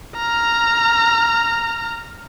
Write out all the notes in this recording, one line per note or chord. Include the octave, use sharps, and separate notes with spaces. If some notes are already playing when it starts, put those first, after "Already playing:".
A#5 F6